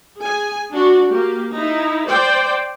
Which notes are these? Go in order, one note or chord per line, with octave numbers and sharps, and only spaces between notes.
G#4 G#5
D4 F#4
A#3 G4
D#4 E4
C5 D5 G5